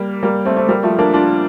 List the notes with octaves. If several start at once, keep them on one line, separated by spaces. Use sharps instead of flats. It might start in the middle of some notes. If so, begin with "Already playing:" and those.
Already playing: G3 A#3
G3 A#3
A3 C4
A3 C4
G3 A#3
F3 A3
A#3 D4
D4 F4